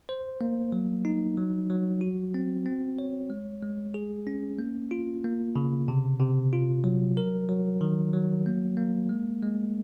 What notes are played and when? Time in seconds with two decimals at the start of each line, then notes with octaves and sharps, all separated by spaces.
0.09 C5
0.41 A#3
0.72 F#3
1.05 D#4
1.37 F#3
1.70 F#3
2.01 F#4
2.34 C4
2.66 C4
2.99 C#5
3.30 G#3
3.63 G#3
3.94 G#4
4.27 C#4
4.59 A#3
4.91 F4
5.24 A#3
5.56 C#3
5.88 C3
6.20 C3
6.53 F4
6.84 F#3
7.17 A#4
7.49 F#3
7.81 D#3
8.13 F#3
8.46 A#3
8.77 A#3
9.09 G#3
9.43 G#3